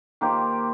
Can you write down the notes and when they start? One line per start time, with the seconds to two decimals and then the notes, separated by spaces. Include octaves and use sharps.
0.21 D#3 A#3 G4 C5